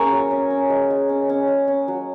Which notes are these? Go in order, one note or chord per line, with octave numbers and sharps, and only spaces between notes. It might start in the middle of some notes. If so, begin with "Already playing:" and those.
Already playing: A#3 C#4 G#4 A#4 C#5
F#3
C#4
C#4
G#3
G#3
C#4
C#4
G#3
C#4
F#3